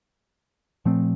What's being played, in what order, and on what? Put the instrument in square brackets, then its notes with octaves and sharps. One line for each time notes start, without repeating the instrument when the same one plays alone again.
[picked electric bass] A#2 F3 A3 C4